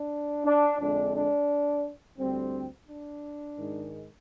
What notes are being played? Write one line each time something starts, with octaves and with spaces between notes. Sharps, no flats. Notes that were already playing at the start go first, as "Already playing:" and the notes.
Already playing: D4
D4
F2 D3 G#3 C4 D4
D4
D2 D3 G3 C4
D4
G#2 D#3 G#3